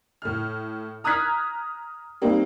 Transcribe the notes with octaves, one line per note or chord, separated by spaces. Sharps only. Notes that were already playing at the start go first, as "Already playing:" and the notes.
A2 F6
A#5 D#6 F6 F#6 G#6 B6
G3 A#3 C4 D#4